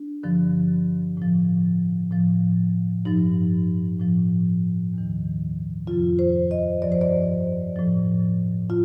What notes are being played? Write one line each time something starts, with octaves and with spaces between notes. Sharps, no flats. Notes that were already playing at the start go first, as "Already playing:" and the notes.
Already playing: D4
G2 D3 F3
A2 F3
A2 F3
G2 F3 D#4
A2 F3
D#2 D#3
F2 C3 F3 F4
C5
D#5
G2 F3 D5
C5
D5
A2 F3
F4